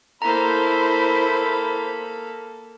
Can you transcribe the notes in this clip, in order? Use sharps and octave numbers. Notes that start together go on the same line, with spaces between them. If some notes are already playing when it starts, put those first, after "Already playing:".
A#3 E4 A4 C5 A#5 B5